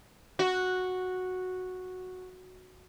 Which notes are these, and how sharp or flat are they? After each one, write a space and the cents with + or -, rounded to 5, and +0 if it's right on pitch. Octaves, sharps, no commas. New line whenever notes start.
F#4 -5